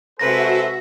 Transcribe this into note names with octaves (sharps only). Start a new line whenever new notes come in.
C3 G#3 F#4 A4 B4 C5 E5 A#6